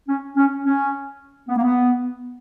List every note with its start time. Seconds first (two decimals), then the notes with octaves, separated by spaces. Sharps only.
0.08 C#4
0.36 C#4
0.65 C#4
1.48 B3
1.57 A#3
1.63 B3